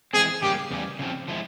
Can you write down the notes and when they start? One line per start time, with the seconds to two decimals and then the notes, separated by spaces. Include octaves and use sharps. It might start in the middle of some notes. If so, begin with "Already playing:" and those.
0.13 E3 G#3 C4 G#4
0.42 C#3 G3 A#3 G4
0.71 E2 C#3 G3
0.99 C#3 F3 C4
1.28 F3 G#3 E4